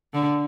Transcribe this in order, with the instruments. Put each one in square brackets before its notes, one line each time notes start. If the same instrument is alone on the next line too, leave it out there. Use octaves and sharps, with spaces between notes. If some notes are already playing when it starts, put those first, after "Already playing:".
[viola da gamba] D3